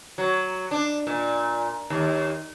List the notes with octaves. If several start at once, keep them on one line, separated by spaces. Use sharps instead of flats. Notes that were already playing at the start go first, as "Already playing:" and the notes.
F#3
D4
A#2
D#2